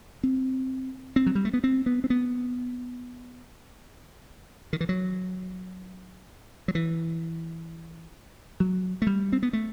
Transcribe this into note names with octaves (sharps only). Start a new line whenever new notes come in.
C4
C4
F#3
G3
A3
B3
C4
B3
C4
B3
D#3
E3
F#3
F#3
E3
F#3
A3
G3
C4
B3
A3